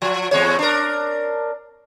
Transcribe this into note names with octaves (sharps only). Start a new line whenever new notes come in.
F3
E2 G#3 C#5
D4 A#4